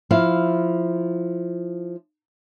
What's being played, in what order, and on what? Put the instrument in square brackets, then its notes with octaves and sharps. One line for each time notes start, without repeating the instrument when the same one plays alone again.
[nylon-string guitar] F3 E4 F5